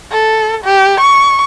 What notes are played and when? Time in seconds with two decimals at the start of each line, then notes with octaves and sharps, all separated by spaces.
0.12 A4
0.65 G4
1.01 C#6